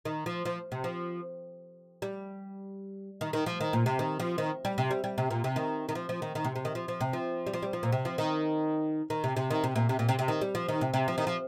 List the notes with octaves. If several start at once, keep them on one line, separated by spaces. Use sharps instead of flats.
D#3
F3
F3
C3
F3
G3
D#3
D#3
F3
D#3
A#2
C3
D#3
F3
D#3
G3
C3
G3
G3
C3
A#2
C3
D#3
D#3
F3
F3
D#3
D#3
C3
C3
D#3
F3
F3
C3
F3
G3
F3
G3
F3
A#2
C3
F3
D#3
D#3
C3
C3
D#3
C3
A#2
C3
A#2
C3
C3
D#3
G3
F3
D#3
C3
C3
F3
D#3
F3